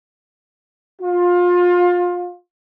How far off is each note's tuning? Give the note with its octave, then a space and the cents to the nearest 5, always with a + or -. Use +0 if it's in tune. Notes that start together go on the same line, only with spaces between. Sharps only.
F4 +25